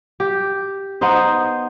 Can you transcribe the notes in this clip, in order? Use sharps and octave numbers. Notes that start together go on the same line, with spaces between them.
G4
B3 D#4 C5 D#5